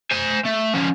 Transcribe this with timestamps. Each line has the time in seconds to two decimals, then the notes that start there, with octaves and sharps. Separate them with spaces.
0.11 C5 G#5
0.45 A3
0.74 F3 C#4